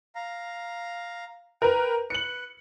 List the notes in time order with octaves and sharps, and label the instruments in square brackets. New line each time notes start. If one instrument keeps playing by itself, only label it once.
[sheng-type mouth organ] F5 A#5
[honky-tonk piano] A#4 B4 [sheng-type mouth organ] G5
[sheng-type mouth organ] B4 [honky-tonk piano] C#7 F#7